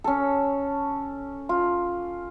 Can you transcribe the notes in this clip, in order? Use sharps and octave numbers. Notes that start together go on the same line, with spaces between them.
C#4 A4
F4